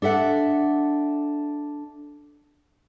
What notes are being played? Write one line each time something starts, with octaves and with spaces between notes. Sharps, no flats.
D4 A4 E5 F#5